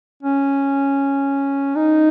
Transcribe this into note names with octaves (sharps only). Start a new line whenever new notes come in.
C#4
D#4